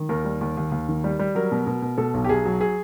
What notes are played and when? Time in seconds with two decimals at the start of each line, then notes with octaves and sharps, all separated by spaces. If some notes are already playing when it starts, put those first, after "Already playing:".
Already playing: D#3
0.09 D#2 A#4
0.25 G3
0.41 D#2
0.57 D#2
0.72 D#2
0.89 D#3
1.04 G3
1.19 G3
1.35 F#3 A#4
1.52 B2
1.67 B2
1.82 B2
1.98 B2 A4
2.14 B1
2.24 G4
2.29 B1 G#4
2.45 F#3
2.61 G#4